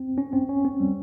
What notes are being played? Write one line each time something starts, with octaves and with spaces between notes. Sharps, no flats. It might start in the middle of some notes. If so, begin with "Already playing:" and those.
Already playing: C4
C#4
C4
C#4
C4
G3